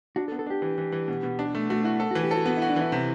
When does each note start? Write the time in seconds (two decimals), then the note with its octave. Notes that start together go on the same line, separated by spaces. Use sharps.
0.16 D4 F#4
0.28 A4
0.32 B3
0.39 A4
0.46 D4 G4
0.62 E3
0.78 E3
0.92 E3
1.08 B2
1.23 B2
1.39 D4
1.55 A3
1.70 A3 F#4
1.84 E4 F#4
2.00 A4
2.11 E3 F#4
2.24 G4
2.31 F#4 A4
2.46 B3 F#4
2.57 E4 F#4
2.69 D4
2.76 E3 E4
2.92 C3